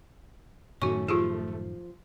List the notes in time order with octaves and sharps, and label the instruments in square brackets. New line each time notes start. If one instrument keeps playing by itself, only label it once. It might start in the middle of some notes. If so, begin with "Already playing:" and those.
[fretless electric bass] F#2 A2 D#3 [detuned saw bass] A3 [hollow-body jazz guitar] C#4 [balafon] F#4 C#6
[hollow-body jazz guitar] F3 [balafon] F4 G4 G#4